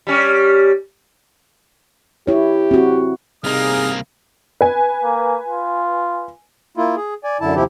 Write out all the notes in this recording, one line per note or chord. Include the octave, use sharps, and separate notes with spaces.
G3 C#4
E4 G4 C#5
C4 F#4
C2 C3 A#3 D#4 G#4 F5 D#6 F6
B4 G#5
A#3
F4
A#3 E4 F4
G#4
D5 G#5
F#2 D3 E4 A5
D#2 C3 F3 E4 G4